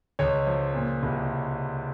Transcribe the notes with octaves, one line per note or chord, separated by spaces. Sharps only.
C#2 C#5
F3
A#2
C2